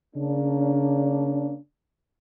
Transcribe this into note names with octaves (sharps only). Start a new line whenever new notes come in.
C#3 A#3 C#4 D4